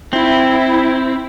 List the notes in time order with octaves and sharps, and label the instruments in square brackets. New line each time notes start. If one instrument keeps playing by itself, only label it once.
[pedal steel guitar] C4 [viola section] E4